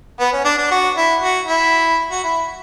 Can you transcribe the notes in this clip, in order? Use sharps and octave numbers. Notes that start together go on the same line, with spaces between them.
B3
C#4
D4
D4
F#4
E4
F#4
E4
F#4
E4